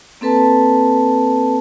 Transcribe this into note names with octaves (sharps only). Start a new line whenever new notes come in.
A#3 C4 A4 B4 A5